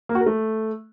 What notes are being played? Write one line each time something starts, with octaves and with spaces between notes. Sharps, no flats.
A#3
F#4
A#4
A3